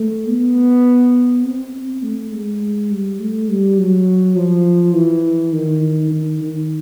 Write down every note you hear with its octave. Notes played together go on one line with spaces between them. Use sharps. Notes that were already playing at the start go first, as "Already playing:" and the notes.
Already playing: A3
B3
C4
A3
G#3
G3
A3
G3
F#3
F3
E3
D#3
D#3
D#3